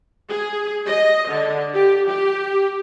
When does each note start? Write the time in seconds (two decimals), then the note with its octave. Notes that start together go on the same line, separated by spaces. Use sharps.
0.28 G#4
0.87 D#5
1.28 D3
1.73 G4
2.06 G4